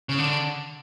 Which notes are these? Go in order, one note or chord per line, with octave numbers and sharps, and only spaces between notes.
C#3
D3